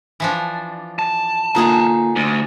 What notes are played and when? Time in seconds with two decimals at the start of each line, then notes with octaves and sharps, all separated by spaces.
0.20 E3 F3 D4
0.99 A5
1.55 D3 A#3 D#4 F4 G#4 A#5
2.16 D2